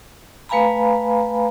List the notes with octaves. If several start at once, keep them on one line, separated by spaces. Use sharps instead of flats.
A3 B4 F5 G#5 A#5 B5